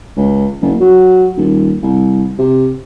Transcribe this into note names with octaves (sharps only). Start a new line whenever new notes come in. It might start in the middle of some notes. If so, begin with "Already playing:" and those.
C#2
F#1
F#3
D#1
C2
C3